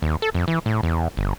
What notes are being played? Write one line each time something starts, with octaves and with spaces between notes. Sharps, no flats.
D#2
A4
F2
E3
A2
E2
G1